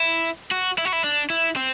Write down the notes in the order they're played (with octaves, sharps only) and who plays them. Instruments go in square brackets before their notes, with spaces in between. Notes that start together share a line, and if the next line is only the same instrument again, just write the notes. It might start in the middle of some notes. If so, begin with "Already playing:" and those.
Already playing: [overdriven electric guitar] E4
F#4
E4
F#4
E4
D4
E4
C4